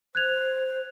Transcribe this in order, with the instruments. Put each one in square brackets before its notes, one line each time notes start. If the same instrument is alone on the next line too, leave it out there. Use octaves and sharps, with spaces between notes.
[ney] C5 [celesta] F#6 G#6 F7